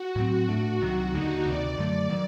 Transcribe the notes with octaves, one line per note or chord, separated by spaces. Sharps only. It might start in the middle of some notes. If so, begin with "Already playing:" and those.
Already playing: F#4
A2 F#3 C4
A2 A3 D4
C2 C3 D#3 F#3 F#4
D#2 D3 G3 A#3 D#4
D2 C3 D#3 D5
F#2 D3 F#3 A3
D#3 F#3